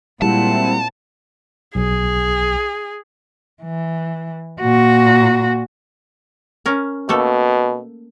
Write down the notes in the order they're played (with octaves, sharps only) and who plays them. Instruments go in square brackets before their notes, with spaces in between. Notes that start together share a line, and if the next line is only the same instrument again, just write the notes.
[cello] A#2 F#5 [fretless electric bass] G3 G#3 A#3 [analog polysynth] C4 E4 [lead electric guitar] A5
[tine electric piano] B1 [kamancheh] G#4
[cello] E3
A#2 F#4
[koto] C#4 A#4
[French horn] B2 [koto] A3 A#3 A4